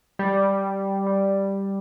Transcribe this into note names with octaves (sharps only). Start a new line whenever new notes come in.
G3
G3